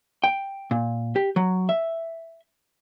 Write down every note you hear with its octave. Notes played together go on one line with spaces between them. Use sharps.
G5
A#2
G4
F#3
E5